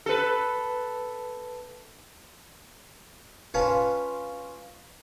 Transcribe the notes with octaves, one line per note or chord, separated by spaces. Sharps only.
A4 B4
C#4 F4 B4 A5